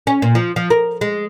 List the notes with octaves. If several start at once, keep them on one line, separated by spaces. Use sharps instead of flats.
C#4
A#2
F3
F3
A#4
G#3